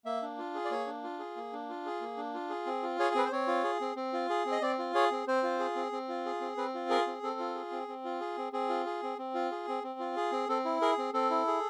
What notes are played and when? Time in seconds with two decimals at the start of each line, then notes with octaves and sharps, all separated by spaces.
0.05 A#3 E5
0.22 D4
0.38 F4
0.55 G#4
0.65 D5
0.71 A#3 C#5
0.86 D4
1.04 F4
1.19 G#4
1.36 A#3
1.53 D4
1.69 F4
1.85 G#4
2.01 A#3
2.17 D4
2.34 F4
2.49 G#4
2.66 C4
2.83 F4
2.99 G#4 C#5
3.15 C4 B4
3.25 C5
3.32 C4 C#5
3.47 F4
3.64 G#4
3.81 C4
3.96 C4
4.13 F4
4.30 G#4
4.46 C4
4.52 D#5
4.61 C4 D5
4.79 F4
4.95 G#4 C#5
5.11 C4
5.27 C4 C5
5.43 F4
5.59 G#4
5.76 C4
5.92 C4
6.08 F4
6.26 G#4
6.41 C4
6.57 C4 B4
6.74 F4
6.90 G#4 A#4
7.07 C4
7.23 C4 A4
7.40 F4
7.55 G#4
7.71 C4
7.88 C4
8.05 F4
8.20 G#4
8.37 C4
8.53 C4 G#4
8.69 F4
8.86 G#4
9.03 C4
9.18 C4
9.34 F4
9.52 G#4
9.68 C4
9.83 C4
9.99 F4
10.16 G#4
10.32 C4
10.48 C4 A4
10.65 E4
10.81 G#4 A#4
10.98 C4
11.13 C4 A4
11.30 E4
11.47 G#4